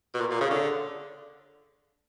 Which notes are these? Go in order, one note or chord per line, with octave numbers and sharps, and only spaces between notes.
B2
A#2
A#2
C#3
D3